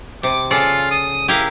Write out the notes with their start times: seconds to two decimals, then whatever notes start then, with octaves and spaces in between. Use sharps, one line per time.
0.23 C3 D6
0.51 C#3 F4 A4 D5
0.91 D#6
1.28 E4 G4 A#4 F5